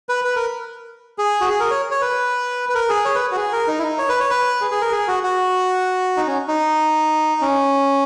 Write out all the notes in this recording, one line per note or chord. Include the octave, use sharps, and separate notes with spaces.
B4
B4
A#4
G#4
F#4
G#4
A#4
C#5
C#5
B4
B4
A#4
G#4
C#5
B4
F#4
G#4
A#4
D#4
E4
D#4
C#5
B4
C#5
B4
G#4
G#4
A#4
G#4
F#4
F#4
D#4
C#4
D#4
C#4